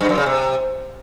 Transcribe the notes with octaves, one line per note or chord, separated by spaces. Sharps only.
G2
F#2
C#3
C3